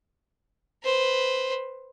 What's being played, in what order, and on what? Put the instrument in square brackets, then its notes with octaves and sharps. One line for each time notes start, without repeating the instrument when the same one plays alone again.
[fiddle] B4 C5